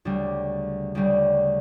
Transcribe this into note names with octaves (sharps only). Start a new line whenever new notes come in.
D2 C#3 G3 D4
D2 C#3 G3 D4